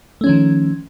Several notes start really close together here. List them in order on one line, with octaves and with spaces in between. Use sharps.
A3 C#4 F3 D#3